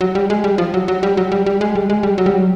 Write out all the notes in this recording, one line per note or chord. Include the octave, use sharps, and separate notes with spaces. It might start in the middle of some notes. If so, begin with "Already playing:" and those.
F#3
G3
G#3
G3
F3
F#3
F#3
G3
F#3
G3
G3
G#3
G3
G#3
G3
F#3
G3
F#3